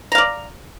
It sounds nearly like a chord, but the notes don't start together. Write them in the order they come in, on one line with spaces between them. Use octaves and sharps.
A#5 F5 D5